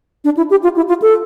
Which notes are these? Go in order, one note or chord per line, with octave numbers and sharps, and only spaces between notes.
D4
E4
G4
F4
E4
F4
A4